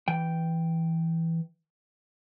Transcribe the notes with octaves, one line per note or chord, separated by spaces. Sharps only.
E3 G5